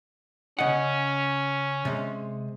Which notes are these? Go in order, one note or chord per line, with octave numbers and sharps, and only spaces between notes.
C#3 C#4 D#5 F#5
C3 G#3